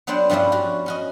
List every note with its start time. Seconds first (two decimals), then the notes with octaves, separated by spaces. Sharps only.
0.07 F#3 B3 D4 C5 F#5 G5
0.30 G2 F3 G3 C#4 D4 E4
0.52 F#4 F5
0.86 C#4 F#4 D#5